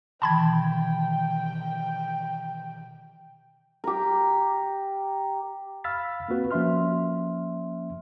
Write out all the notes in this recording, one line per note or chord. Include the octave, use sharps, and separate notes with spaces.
B2 D#3 E3 G5 A5 B5 G#6
G4 A#4
F5 B5 E6 F6 A6 B6
A#3 C4 F4 F#4 B4
F3 A#3 C#4 E5 C6 F6